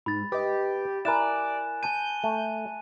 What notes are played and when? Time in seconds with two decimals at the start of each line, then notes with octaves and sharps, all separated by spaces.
0.06 G#2 B5 A6
0.32 G4 B4 D#5
1.05 E4 A#4 D5 G#5 F#6 E7
1.83 G#5 A5 G6 D#7
2.23 A3